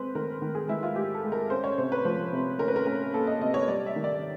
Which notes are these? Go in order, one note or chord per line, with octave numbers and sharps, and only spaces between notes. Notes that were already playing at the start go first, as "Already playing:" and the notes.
Already playing: G#3 C4 B4 C5
D#3 A#4
D#3
G#4
G#3 E4
F4
G#3 G4
A4
G#3
A#4
C#4 C5
C#5
C3 C5
B4
F3 C5
C3
C#4 A#4
B4
A#4
C#4 A#4
A#3 A4
D#5
C3 D#5
C#5
G3 D5
E5
D#3
D5